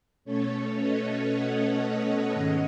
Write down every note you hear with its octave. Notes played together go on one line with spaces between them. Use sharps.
B2 A3 C#4 A4 C#5
B4 D#5
D#5 F#5
D#5 F#5
G#2 D#3 G#3 C#4